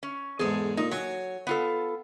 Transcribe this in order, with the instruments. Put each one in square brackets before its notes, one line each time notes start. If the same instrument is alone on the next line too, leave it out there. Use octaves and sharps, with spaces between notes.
[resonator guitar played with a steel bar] C#4
[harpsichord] E2 G#2 [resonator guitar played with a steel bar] G#4 A4
[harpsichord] A#2 [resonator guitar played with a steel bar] D#4
[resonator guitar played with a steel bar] F#3 [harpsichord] C#5 G#5
[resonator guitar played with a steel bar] B3 F4 A4